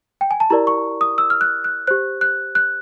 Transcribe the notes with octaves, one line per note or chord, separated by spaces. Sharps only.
G5
G#5
A5
E4 G4 A#4 D5 A#5
C#6
D#6
E6
F6
F#6
F#6
G4 C5 F#6
F#6
F#6